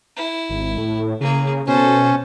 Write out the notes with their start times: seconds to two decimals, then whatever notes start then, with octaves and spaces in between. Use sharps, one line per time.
0.17 E4
0.49 G#1
0.78 A2
1.20 C#3 A#3 G#4
1.67 B2 C#4 A4 C5